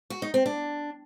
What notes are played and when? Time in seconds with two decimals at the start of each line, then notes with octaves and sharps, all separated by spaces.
0.10 F#4
0.22 D#4
0.34 C4
0.46 D4